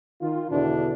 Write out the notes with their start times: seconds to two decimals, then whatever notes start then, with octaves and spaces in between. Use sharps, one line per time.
0.21 D#3 F4
0.50 E2 B2 D3 E3 D4